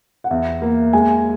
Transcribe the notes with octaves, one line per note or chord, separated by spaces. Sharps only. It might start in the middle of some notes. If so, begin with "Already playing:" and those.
F#5
E2 E5
A#3
G#3 G#5